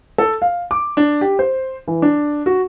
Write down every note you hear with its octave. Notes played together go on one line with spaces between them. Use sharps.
A4
F5
D6
D4
G4
C5
E3
D4
F#4